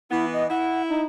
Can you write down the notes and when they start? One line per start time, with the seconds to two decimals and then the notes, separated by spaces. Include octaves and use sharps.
0.11 E3 B3 E4
0.33 D#5
0.49 E4 F#5
0.89 D#4